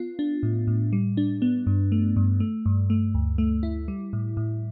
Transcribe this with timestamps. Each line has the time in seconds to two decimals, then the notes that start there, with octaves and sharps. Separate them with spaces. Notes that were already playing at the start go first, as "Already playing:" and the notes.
Already playing: B3 F4
0.19 D4
0.43 A2
0.67 A2
0.93 G3
1.17 D4
1.42 B3
1.67 G2
1.92 A3
2.16 G2
2.40 A3
2.66 G2
2.90 A3
3.14 D2
3.38 A3
3.63 E4
3.88 G3
4.13 A2
4.37 A2